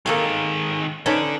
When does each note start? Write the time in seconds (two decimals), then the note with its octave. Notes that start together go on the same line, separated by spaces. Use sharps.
0.06 D#3 A#3 G#4 A4 F5
1.06 C#4 D#4 A4 B4 D5